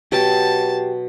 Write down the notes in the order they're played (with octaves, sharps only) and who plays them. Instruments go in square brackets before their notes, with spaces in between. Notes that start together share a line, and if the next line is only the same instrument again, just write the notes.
[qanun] B2 F#3 G5 [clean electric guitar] G4 [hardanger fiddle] A5